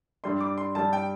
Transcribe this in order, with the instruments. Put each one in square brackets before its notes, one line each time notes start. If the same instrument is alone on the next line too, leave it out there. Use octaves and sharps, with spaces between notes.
[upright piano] G2 G3 D4 [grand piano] C6
[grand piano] D6
C6
[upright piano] G2 G3 D4 [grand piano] A5
[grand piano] G5